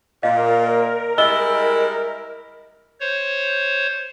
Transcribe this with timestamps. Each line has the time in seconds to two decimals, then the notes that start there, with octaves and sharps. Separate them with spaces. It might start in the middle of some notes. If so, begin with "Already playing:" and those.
0.23 A#2 A#4 D#5 F5
1.18 G3 G#3 E4 D#5 E6 G7
3.00 C5 C#5